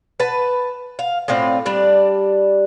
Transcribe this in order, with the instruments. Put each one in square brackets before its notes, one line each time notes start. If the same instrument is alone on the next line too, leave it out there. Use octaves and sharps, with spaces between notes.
[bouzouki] B4 A5
F5
A2 C4 F4 D5
G3 D4 D5